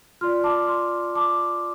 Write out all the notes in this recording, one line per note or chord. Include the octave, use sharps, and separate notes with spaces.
F4 D5 C6 F6
A5 D6
C6 F6
A5 D6